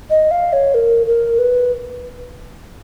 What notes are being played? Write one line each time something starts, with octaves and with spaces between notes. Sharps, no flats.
D#5
F5
C#5
A#4
A#4
B4